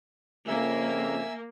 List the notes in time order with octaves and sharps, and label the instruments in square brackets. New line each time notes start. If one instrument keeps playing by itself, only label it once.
[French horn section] F2 C#3 [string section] A#3 [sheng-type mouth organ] E5 G#5 E6